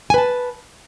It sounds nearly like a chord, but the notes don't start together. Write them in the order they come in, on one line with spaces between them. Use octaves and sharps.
G#5 B4 A5